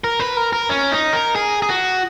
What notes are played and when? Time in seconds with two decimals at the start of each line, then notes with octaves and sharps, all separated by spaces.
0.04 A#4
0.20 B4
0.37 A#4
0.53 A#4
0.69 C#4
0.92 D#4
1.13 A#4
1.35 G#4
1.62 G#4
1.69 F#4